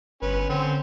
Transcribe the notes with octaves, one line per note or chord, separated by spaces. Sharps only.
G1 C#4 B4
D3 C4 C#4